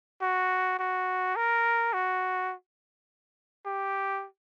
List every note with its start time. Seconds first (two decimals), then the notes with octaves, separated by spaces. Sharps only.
0.22 F#4
0.79 F#4
1.36 A#4
1.93 F#4
3.66 G4